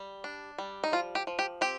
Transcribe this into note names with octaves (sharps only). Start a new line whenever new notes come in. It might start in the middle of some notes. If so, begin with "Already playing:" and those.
Already playing: G3
D4
G3
D#4
F3 F4
G4
F3
G4
C4 G4